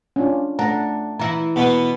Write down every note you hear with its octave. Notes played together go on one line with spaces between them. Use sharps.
C#4 D4 F4
A3 D4 F#5 A#5
E3 E4 A#5
B2 B3